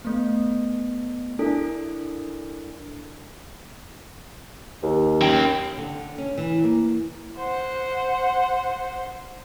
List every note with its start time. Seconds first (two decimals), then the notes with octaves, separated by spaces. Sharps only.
0.05 A3 B3
1.39 D4 E4 A4 A#4 D5
4.83 D#2
5.22 C#4 G5
5.77 D3
6.18 C#4
6.38 E3
6.64 A#3
7.37 C5 F#5